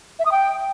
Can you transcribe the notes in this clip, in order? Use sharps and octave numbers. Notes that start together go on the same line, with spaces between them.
E5
D#6
G5